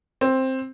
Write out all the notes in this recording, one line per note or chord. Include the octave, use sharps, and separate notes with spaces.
C4